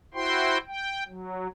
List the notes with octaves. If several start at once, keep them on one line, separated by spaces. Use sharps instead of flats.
E4 F#4 C5 G5 C6
G5
F#3